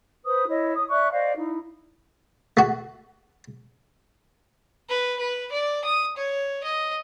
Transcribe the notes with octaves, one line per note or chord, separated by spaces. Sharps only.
B4 C5 D#6
E4 C#5 D#5
D#6
D5 E5 C#6 F#6
C5 D5 D#5 F5
D#4 E4
A3 F#4
B4
B4
D5
D#6
C#5
D#5